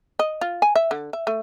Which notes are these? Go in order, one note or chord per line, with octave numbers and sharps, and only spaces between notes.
D#5
F4
G#5
E5
D3
E5
A3